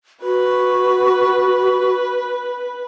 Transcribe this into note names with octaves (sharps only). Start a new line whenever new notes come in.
F#4 B4